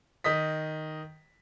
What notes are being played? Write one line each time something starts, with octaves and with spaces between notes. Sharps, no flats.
D#3 D#5 D#6 B6